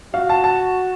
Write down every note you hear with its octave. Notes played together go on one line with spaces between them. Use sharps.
F#4 F5
A5
A5